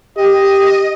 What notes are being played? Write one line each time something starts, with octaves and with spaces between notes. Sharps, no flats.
G4 D#5